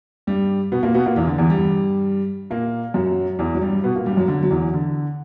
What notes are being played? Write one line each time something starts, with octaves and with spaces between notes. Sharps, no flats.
G2 G3
B2 B3
A#2 A#3
B2 B3
A#2 A#3
E2 E3
D3
E2 E3
G2 G3
A#2 A#3
F#2 F#3
E2 E3
F#3
G2 G3
B2 B3
A#2 A#3
G2 G3
F#2 F#3
D3
F#3
E2 E3
D3